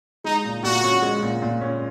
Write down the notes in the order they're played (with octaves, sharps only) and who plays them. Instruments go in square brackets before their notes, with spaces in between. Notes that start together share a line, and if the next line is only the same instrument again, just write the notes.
[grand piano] G#3 [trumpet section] D#4
[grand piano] A#2
[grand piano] A#2 [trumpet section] F#4
[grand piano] C#4
G#3
A#2
A#2
C#4